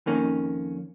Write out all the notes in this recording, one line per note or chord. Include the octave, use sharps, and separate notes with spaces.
F2 D#3 A#3 C#4